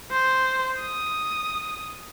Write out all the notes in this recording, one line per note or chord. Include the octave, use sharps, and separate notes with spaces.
C5
D#6